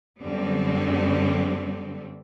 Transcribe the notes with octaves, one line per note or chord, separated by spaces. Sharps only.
F#2 D3 G3 B3 C4